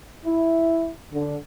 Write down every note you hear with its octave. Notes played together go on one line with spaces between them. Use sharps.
E4
D3